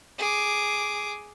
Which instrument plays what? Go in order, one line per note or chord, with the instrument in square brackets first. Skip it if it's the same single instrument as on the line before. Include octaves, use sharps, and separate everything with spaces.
[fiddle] G#4 D6